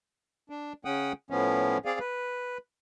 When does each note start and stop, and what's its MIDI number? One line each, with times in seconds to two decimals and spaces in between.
0.50 0.73 62
0.85 1.13 49
0.85 1.13 61
0.85 1.13 78
0.85 1.13 79
0.85 1.13 87
1.30 1.78 45
1.30 1.78 53
1.30 1.78 59
1.30 1.78 61
1.85 1.99 60
1.85 1.99 68
1.85 1.99 74
1.85 1.99 77
1.99 2.58 71